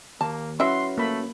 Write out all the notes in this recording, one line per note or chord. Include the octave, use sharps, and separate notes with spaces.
D#2 A#3 A5
F#3 C#4 E4 F#4 B4 E5 C6
A3 A#3 B5